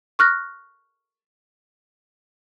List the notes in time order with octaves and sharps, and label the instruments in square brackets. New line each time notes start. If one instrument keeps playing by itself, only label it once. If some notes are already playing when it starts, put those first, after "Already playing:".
[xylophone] C#6 F6 F#6 A#6